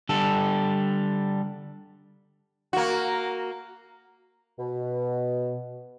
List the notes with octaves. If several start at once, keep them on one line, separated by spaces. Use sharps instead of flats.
D3 G3 A4
A#3 F#4
B2